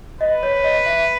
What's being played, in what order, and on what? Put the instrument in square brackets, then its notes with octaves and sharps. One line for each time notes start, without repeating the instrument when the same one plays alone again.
[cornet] B4 [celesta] D#5
[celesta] C#5
C#5
D#5
E5